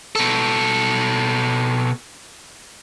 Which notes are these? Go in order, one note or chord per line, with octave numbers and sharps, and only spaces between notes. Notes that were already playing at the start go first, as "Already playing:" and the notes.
B2 A4